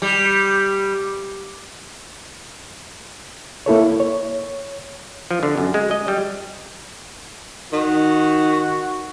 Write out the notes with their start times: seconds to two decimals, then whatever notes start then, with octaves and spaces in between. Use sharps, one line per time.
0.02 G3
3.66 A#3 E4 A4 C#5
4.00 C#5
5.31 F3
5.43 D3
5.57 F#2
5.74 G#3
5.91 D#5
6.08 G3
7.72 D#3 F#4